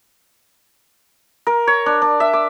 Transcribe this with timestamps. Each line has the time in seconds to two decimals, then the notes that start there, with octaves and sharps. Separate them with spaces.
1.47 A#4
1.67 C#5
1.86 D4
2.02 D4
2.20 E5
2.33 D6